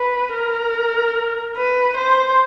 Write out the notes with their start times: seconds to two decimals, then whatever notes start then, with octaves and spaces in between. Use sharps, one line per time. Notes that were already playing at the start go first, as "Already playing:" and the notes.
Already playing: B4
0.33 A#4
1.57 B4
1.97 C5